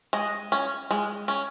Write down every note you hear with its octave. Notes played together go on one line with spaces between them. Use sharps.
G#3 D#5
C#4
G#3
C#4